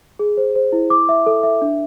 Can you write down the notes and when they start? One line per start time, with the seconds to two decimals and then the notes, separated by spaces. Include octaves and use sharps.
0.19 G#4
0.37 C5
0.56 C5
0.72 E4
0.90 D6
1.09 E5
1.26 A4
1.43 E5
1.62 D4